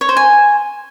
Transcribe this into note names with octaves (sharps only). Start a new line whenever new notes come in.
C#5
C5
G#5